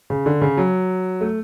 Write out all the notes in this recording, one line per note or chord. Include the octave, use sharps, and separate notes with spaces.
C#3
D3
C#3
F#3
A3